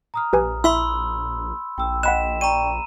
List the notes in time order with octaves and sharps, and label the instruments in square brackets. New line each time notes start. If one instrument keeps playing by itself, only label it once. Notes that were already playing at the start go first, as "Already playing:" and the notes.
[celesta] A#5 D#6 F6
[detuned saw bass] A#1 [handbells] G4 B4 G#5
[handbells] E4 E5 [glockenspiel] B5 C6 E6
[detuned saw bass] A#1 [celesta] G5 E6
[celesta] D#5 G5 B6 [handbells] F#5 B5 F#6 [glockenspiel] E7
[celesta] D5 G5 C#6 [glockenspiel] A#5 D#7